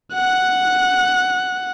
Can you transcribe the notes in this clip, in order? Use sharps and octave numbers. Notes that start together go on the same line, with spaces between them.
F#5 F#6